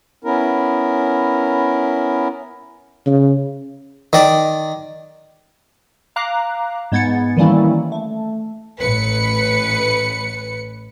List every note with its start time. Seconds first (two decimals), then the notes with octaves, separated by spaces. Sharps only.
0.24 B3 C#4 E4 A#4
3.06 C#3
4.13 D#3 D5
6.16 F5 A#5 D6 F#6
6.92 G#2 G#3 B3 G#6 A6 C#7
7.37 D#3 E3 G3 A#3 C#4 E4
7.92 A3
8.80 A1 B4 C#7